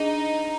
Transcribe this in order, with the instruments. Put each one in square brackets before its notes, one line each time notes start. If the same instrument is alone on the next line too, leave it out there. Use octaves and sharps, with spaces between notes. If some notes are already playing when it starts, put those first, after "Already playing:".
Already playing: [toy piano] D4 G#4 [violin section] D#4